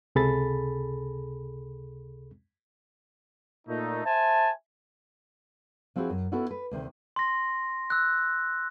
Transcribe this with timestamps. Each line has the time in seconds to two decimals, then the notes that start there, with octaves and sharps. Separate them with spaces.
0.15 C#2 C3 G#4 A4 B5 A6
3.68 A#2 A3 D#4
4.05 C5 E5 G#5 A5
5.96 F3 C4 E4 F#4 G#4
6.10 F#2
6.32 B3 C#4 E4 F#4 A4 A#4
6.51 B4
6.71 D2 C3 D#3
7.16 C6 A#6
7.90 E6 F#6